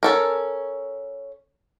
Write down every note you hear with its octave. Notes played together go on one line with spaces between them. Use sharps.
C#4 A4 A#4